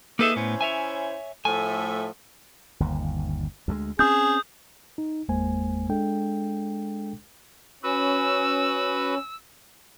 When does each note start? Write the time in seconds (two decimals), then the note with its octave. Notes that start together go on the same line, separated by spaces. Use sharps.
0.19 A#3 D#4 G#4 A4 B4 E5
0.36 A2 B3 C#4 E4 C5
0.61 C#5 E5 G#5
1.45 A2 F3 A3 G#5
2.80 G1 D#2
3.68 D2 G3 G#3
3.99 C4 C#4 G#4 D#6 G6
4.98 D#4
5.28 G1 E2 G#3 A#3 C5 G#5
5.89 G#3 D4 A4 G5
7.83 C#4 F#4 B4 B5 E6